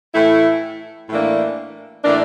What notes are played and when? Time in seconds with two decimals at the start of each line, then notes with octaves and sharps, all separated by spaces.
0.14 A2 E3 A3 E4
1.09 A2 E3 A#3 D4
2.04 A2 E3 A#3 D4